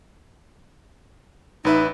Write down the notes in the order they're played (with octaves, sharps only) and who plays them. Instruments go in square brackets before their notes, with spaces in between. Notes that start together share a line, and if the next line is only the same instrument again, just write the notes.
[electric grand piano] A1 B4 E5 [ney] D#4